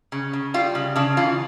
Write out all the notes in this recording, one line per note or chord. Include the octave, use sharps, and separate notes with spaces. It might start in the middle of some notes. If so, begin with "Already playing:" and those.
C#3
C#3
G3 F4
C#3
C#3 D4
E3 F4